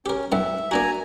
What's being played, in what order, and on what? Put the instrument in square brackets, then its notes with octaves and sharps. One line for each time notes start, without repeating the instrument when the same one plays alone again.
[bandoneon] C#4 [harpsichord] G4 A#4
[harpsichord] B1 F#2 A#5 [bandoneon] E5
[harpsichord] A#3 D4 F#4 [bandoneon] G#5 A#5